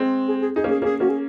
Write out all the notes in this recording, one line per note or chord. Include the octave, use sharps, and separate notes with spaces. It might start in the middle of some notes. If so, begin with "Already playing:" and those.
Already playing: G#3 C4
G#4
G#4
D#4 G#4
A#3 C#4
G#4
A#3 C#4 G#4
A#3 C#4 F#4
G#4